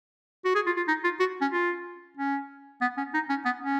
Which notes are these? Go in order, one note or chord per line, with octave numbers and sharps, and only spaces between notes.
F#4
G#4
F4
F4
D#4
F4
F#4
C#4
F4
C#4
B3
C#4
D#4
C#4
B3
C#4